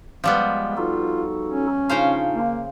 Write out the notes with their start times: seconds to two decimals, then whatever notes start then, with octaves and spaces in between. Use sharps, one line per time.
0.24 F3 G3 G#3 B3
0.77 D#4 F4 F#4 A4
1.46 C#4
1.89 C#3 D4 D#4 F4 C5 F5
2.34 A#3